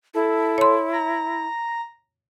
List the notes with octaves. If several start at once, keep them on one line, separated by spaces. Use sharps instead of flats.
E4 A4
C#5 C6
A#5